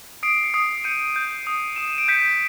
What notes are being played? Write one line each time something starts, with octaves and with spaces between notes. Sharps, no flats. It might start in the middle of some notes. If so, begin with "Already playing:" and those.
D#6 C7 D7
C#7
D#6 C7 D7
G6 C#7 D#7
G6
D#6
D#6 E7
D#7
D7
G6 B6 C#7